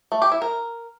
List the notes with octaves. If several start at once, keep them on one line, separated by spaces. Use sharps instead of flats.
A3
G4
E4
A#4